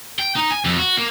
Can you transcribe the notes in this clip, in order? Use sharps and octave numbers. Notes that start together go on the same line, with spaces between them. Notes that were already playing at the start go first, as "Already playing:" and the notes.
G5
D#4
G#5
F2
F#4
A#3